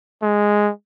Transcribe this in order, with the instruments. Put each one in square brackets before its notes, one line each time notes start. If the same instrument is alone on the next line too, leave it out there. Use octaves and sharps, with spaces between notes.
[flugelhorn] G#3